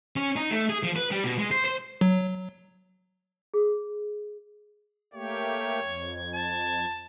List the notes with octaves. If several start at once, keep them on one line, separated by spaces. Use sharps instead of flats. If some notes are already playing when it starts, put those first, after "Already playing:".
C#4
D#4
A3
G#4
F3
B4
G3
B2
G#3
C5
C5
F#3
G#4
A3 A#3 G4 C#5
F2 G#6
A5